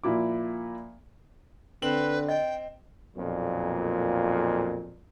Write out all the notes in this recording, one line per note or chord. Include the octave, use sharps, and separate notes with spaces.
A#2 F3 E4 D6
D3 C4 B4 F#7
D#5 G5
B1 F2 A#2